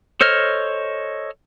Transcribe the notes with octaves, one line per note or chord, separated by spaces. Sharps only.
A4 C5 C#5 D#5 F6